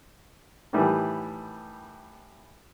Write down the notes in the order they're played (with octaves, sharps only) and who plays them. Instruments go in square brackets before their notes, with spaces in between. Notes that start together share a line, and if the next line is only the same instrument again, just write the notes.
[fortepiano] A2 D#3 E3 G3